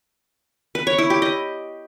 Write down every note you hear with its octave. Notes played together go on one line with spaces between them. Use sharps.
B4
C#5
E4
G4
D#5